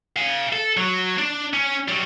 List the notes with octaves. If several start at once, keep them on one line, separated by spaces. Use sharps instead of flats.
F5 G#5
A4
F#3
D4
C#4
F#3 G3